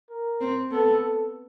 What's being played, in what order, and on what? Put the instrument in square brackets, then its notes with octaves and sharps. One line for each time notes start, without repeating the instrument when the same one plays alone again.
[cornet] A#4
[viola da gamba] C4
[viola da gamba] B3 [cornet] A4
[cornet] A4